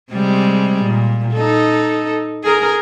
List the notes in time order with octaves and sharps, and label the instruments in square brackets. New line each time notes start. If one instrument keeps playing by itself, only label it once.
[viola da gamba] C3 G3 G#3
A#2
D#4 A4
G#4 A#4